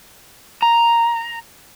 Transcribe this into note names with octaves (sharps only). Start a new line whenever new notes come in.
A#5